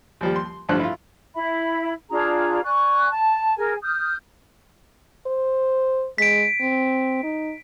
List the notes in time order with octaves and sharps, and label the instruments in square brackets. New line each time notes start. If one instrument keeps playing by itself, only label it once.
[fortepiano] D#2 F3 G3
C6
A1 G2 D3 F3 C5 F#6
E4 F4
[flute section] E4 E5 B5
D4 F4 G#4 A#5
D5 G#5 C#6 F#6
A5
G#4 A#4 G#5
D#6 F6 G6
[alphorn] C5
[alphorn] G#3 [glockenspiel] B6 D7
[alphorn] C4
D#4